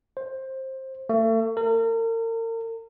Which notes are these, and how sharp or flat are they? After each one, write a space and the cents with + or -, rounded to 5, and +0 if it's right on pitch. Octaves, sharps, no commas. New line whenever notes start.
C5 +15
A3 +35
A#4 -40